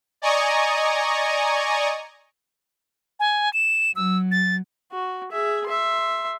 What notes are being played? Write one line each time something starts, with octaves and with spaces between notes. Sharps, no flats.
D5 D#5 G#5 A#5 C#6 D#6
G#5
E7
F#3 E6
A6
F#4
G#4 E5
E5 C6